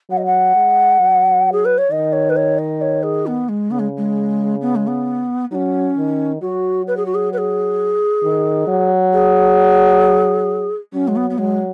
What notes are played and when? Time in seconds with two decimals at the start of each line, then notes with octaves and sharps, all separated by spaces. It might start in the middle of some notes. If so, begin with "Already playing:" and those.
0.10 F#3 F#5
0.17 D#5
0.26 F#5
0.55 G#3
1.00 F#3
1.52 G#4
1.65 B4
1.78 C#5
1.91 D#3 D#5
2.12 C#5
2.30 B4
2.36 C#5
2.58 D#5
2.81 C#5
3.03 G#4
3.27 B3
3.49 G#3
3.71 C#3 B3
3.79 G#3
3.97 G#3
4.61 B3
4.75 G#3
4.88 B3
5.51 F#3 C#4 D#4
5.97 D#3
6.41 F#3 F#4
6.87 B4
6.97 G#4
7.06 F#4
7.14 G#4
7.33 B4
7.38 G#4
8.23 D#3
8.68 F#3
9.13 G#4
10.93 F#3 C#4
11.08 G#3
11.16 B3
11.30 B3
11.38 F#3 G#3